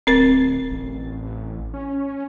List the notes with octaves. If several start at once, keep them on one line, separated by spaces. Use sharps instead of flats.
D1 C4 A#4 A6
A1
C#4